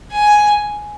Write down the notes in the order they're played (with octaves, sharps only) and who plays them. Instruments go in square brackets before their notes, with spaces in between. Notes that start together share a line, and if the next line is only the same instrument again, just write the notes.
[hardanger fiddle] G#5